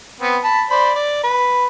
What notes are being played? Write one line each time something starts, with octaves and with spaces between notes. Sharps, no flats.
B3 C4
A5 B5
C5 D5 B5
D5
B4